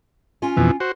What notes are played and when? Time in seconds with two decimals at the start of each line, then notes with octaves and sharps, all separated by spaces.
0.42 C#4 F4 G#5
0.57 F2 B2 E3
0.80 F#4 C5